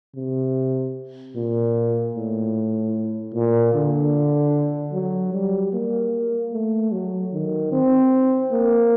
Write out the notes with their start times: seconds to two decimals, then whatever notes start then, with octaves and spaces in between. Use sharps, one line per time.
0.16 C3
1.36 A#2
2.15 A2
3.34 A#2
3.74 D3
4.93 F#3
5.33 G3
5.73 A#3
6.53 A3
6.92 F#3
7.33 D#3
7.72 C4
8.52 A#3